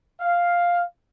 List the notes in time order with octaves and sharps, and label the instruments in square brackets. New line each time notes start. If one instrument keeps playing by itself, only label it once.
[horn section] F5